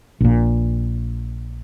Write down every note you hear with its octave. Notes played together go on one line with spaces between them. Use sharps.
A#1 A#2